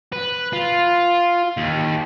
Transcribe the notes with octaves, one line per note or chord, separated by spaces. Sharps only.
B4
F4
D#2